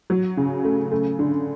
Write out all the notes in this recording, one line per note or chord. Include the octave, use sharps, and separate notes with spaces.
F#3
C#3
A3
A3
D3